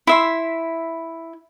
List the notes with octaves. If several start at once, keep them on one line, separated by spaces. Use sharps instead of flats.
E4 E5 C6